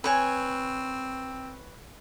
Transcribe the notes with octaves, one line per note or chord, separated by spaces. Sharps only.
C4 B4 C#5 G#5